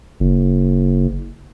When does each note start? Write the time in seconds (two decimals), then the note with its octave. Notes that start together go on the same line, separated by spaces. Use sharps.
0.20 F#1